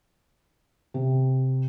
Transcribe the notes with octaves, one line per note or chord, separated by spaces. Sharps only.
C3